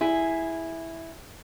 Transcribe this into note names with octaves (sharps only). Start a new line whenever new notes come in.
E4 G#4